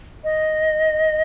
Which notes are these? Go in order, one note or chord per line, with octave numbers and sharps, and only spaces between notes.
D#5